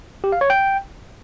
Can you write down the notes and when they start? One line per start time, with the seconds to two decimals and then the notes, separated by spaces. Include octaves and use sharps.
0.24 G4
0.32 F5
0.41 C#5
0.50 G5